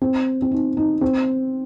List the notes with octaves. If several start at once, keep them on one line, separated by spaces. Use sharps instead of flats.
C4
C4
D#4
D#4
C4